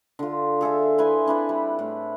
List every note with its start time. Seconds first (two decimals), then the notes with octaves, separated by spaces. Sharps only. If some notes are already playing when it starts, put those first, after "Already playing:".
0.19 D3 F4
0.61 G#4 A4 E5 F5
0.98 E4 B4 G#5 C6
1.26 C4 D4 E4 B4
1.49 G3
1.79 A2